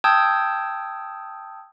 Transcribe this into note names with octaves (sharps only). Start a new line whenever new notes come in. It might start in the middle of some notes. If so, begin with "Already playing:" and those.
G5 A5 D#6 E6 G6 G#6